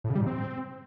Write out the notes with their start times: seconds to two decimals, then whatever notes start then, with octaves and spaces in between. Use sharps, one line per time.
0.04 A2
0.10 C#3
0.15 G3
0.21 G#2
0.26 C4